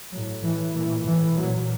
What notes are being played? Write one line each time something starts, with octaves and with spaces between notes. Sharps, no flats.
A2 F#3
A2 E3
A#2 E3
A2 E3
A#2 F#3